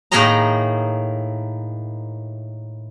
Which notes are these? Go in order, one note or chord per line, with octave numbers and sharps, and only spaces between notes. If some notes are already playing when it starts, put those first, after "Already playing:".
A2 D#3 A#3 G#4 D#5 A#5